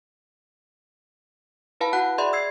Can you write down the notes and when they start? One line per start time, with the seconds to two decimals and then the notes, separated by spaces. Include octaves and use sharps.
1.81 E4 B4 F5 A5 B5
1.93 F#4 F#5 F#6
2.18 G#4 D5 E5 B5 C6
2.33 E6 G#6 C7